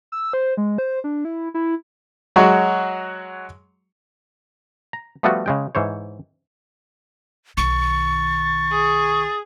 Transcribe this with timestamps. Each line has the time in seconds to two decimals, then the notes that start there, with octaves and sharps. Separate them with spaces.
0.12 E6
0.33 C5
0.57 G#3
0.78 C5
1.04 D4
1.25 E4
1.54 E4
2.36 F#3 G#3 F#4 C#6
4.93 A#5
5.23 F3 G3 A3 B3 F4 F#4
5.46 C#3 G#3 G5
5.75 G#2 E3 C5 C#5
7.57 B1 D#3 C#6 A6
8.71 G#4